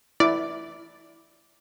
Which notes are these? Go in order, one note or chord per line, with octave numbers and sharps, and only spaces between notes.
E4 D5